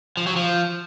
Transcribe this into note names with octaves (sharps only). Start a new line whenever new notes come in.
F3
F#3
F3